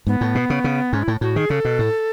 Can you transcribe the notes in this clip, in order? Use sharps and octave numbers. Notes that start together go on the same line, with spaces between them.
G#2 B3
A2
B2
C#3
C#3
G#2 C#4
E4
A2
A2 F#4
D#3 G#4
C#3 A4
B2
A2